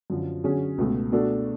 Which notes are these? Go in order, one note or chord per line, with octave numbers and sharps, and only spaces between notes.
F#2 D3 F3
D3 F#3 C#4 G#4
C#2 B2 A3
B2 A3 D4 F#4 A4